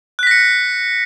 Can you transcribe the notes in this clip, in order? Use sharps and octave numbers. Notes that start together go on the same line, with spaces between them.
F#6 A#6 B6 C#7